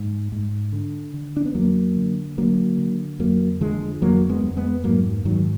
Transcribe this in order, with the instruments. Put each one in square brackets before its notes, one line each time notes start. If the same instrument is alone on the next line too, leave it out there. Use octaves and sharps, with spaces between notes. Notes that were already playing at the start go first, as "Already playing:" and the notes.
Already playing: [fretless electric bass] G#2
G#2
D3
D3
D4
B3
F2 F#3 A#3
D3
D3 F#3 A#3
D3
F2 F#3 A#3
D3 F3 G#3
F2 F#3 A#3
G#3 B3
F2
G#3 B3
G#2 F#3 A#3
G#2 D#3 F#3